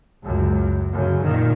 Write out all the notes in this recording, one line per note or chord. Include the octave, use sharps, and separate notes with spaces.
C#2 F#2
F#2 C#3
A#2 D#3